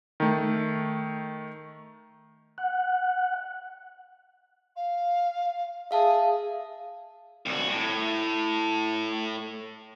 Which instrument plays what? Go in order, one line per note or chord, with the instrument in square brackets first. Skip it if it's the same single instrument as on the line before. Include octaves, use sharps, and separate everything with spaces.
[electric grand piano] D#3 A3
[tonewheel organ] F#5
[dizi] F5
[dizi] G#4 [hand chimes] E5 F5 A5
[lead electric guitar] C2 F#4
A2